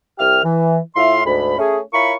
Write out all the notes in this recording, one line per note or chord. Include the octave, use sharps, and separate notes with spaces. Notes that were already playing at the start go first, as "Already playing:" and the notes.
C2 G4 E5 F6
E3
A2 E4 F4 E5 F5 C6
D2 G#2 B5
A3 C#4 G#4
E4 F4 A#4 C#5 B5 C#6